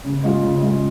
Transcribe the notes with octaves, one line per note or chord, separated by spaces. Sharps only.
C#3
G#3 F4
C#3
G#3 F4